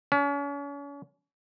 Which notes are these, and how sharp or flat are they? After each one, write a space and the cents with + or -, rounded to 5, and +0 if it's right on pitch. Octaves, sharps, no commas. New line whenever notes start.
C#4 +40